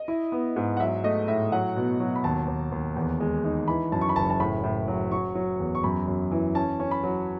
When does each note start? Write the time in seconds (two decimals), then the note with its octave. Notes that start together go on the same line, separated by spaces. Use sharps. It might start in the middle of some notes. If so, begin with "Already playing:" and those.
Already playing: D#5
0.08 E4
0.32 B3
0.56 G#2
0.77 F#5
0.80 F#3 E5
1.04 A3 D#5
1.28 A2 E5
1.52 F#3 F#5
1.76 B2
2.00 F#3
2.15 B5
2.24 D#2 A5
2.48 D#2
2.72 D#2
2.96 E2
3.20 G#3
3.44 D#4
3.67 E3 B5
3.92 F#2 A5
4.01 C#6
4.09 B5
4.16 F#1 A5
4.30 A5
4.40 A2 B5
4.63 A2
4.88 F#3
5.11 F#3 C#6
5.35 F#3
5.59 E2
5.75 C#6
5.84 F#2 B5
6.08 F#2
6.31 E3
6.55 C#4 A5
6.80 C#4
6.91 B5
7.03 F#3